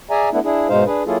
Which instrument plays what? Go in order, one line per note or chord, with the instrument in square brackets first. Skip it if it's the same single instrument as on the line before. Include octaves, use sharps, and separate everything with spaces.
[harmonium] G#4 D5 E5 G#5 A#5
A3 B3 D4 E4
D4 E4 G#4
G#2 B2 G#3 D#4 C5 F5
D4 G#4 B4
F#3 A#3 E4 F4 G#4 A4